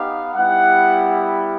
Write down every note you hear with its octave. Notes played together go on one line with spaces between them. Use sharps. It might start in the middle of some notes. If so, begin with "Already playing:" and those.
Already playing: B3 D#4 G4 F5
G3 B3 E4 G4 F#5